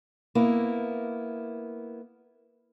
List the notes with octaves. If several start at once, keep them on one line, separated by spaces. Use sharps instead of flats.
A#3 B3 E4